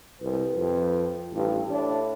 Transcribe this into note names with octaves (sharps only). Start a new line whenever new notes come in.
C2 B4
F2
A1 G2
A2 D4